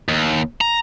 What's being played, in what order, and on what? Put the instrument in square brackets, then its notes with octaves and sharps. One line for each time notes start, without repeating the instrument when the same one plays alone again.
[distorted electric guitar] D#2
A#5